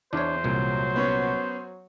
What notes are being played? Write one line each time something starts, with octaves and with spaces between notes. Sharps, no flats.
E2 D4 C5 C#5
C2 A#2 F#3
B3 C#4